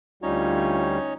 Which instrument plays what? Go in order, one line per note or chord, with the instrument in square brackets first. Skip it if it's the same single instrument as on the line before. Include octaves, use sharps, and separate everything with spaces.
[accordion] D2 G3 [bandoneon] C#4 D#4 C#5 [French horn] F4